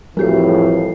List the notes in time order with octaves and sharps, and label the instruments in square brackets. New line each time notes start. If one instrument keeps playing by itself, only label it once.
[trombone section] F2 A2 E3 [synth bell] G3 F#4 C7 [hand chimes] G4 A#4